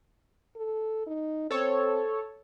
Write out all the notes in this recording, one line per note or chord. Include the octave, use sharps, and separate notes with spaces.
A4
D#4
C4 A4 C#5